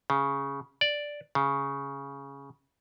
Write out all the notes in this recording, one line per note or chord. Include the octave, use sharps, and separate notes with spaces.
C#3
D5
C#3